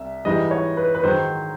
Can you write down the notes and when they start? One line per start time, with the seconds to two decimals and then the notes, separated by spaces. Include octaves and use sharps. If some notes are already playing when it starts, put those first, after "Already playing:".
Already playing: C2 E5
0.25 G#2 E3 G3 D#5
0.51 C#5
0.77 B4
0.95 B4
1.03 G#2 D#3 F#3 C5